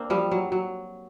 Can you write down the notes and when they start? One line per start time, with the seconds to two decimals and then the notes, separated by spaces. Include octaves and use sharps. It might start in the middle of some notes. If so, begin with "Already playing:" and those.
Already playing: A#3 C4 D4
0.10 F3 G3
0.31 F#3
0.52 F#3